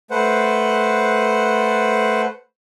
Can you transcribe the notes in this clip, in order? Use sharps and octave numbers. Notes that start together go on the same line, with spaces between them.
A3 B4 C5 F#5